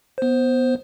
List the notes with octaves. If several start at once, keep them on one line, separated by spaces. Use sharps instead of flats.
B3 C5